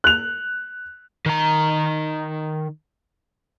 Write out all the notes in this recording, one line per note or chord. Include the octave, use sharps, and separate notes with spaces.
F#6 F7
D#3 A#5